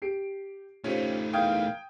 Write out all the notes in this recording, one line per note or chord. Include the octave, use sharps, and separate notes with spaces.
G4 C7 D7
A3 C#4 D#4 F4 G4 C5
E2 A#4 F5 G5 D#6 G6 G#6